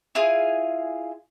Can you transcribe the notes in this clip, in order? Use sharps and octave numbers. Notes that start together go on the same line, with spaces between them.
E4 F4 G#4 G#5